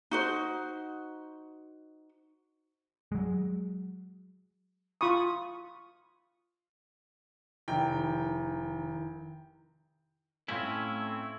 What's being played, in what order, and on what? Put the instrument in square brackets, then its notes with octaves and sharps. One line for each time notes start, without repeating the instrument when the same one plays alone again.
[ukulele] D#4 F#4 C5
[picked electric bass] F#3 G#3
[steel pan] F4 B5 C#6 D#6
[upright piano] F1 [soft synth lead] D#3 [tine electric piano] E4 A#5 [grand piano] G5
[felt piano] A2 F5 G#6 [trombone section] A3 [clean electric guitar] C4 C#4 E4